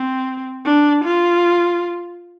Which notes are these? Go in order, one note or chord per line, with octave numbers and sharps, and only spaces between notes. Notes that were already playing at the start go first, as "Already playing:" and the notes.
Already playing: C4
D4
F4